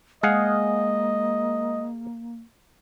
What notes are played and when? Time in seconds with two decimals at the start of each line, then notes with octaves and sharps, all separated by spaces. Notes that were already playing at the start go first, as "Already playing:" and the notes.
0.23 G#3 A#3 G#4 D#5 F5 F#5